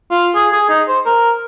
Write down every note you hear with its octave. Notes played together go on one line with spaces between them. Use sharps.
F4
G#4
G#4
D#4
C5
A#4